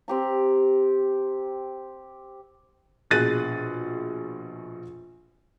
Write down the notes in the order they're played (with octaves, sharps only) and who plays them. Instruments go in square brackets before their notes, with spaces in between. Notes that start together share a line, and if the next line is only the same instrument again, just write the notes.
[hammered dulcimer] C4 G4 A#5
[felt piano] A#1 B2 G#4 F#6 A6 D#7